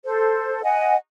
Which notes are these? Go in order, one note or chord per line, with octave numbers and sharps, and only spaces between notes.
A4 C5
D#5 F#5 G#5